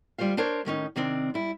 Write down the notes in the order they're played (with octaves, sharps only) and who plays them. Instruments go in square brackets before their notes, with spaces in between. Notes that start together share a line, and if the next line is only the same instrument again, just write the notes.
[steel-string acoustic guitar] D2 G3 F4 C5 F5
D4 A#4 C5 C#5
A2 D#3 C#4 D#4
C3 D#3 C4 D4
G3 E4